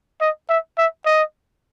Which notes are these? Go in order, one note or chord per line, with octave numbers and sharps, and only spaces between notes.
D#5
E5
E5
D#5